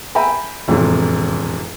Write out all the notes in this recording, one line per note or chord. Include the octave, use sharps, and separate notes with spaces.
E5 G5 G#5 A#5 B5
E1 A1 F2 C3